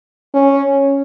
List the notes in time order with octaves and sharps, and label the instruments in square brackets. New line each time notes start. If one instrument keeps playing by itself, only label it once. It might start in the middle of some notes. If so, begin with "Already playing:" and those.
[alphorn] C#4